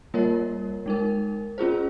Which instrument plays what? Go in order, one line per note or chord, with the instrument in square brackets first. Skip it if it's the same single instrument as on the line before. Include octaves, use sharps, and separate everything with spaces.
[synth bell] G3 A#3 F4 A#4 C#5
G#3 D#4 A#4
C#4 F4 G#4 C5